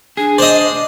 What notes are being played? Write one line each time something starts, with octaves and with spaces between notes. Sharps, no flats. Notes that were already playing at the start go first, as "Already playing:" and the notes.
D4 G#4
C5 D5 D#5